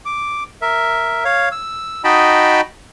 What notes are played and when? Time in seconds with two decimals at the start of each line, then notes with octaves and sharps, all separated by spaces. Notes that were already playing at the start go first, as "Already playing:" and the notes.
0.06 D6
0.62 A#4 E5
1.25 C#5 F5
1.52 E6
2.04 D#4 F#4 D#5 G5 A5 B5